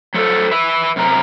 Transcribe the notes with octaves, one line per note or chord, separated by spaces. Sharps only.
F#3 A3 A4 B4 C5
B4 E5
F#2 C3 A#4